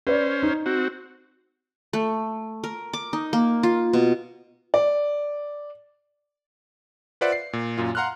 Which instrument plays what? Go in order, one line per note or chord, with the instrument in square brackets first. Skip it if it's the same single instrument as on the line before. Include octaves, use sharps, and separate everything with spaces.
[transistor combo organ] C#4 C5 [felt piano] B4 D5
[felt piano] D#4
[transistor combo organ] C4 F#4
[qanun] A3
A#4
D6
D#4
A#3
F4
B2
[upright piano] D5
[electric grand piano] F4 B4 C5 D5 E5 F#5
C7
A#2
F#2 A#2 F4
F5 F#5 A#5 C6 F6 F#6